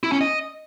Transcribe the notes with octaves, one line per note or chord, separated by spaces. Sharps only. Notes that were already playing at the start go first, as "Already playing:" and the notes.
E4
C#4
D#5